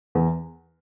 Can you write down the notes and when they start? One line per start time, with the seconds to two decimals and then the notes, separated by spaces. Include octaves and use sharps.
0.15 E2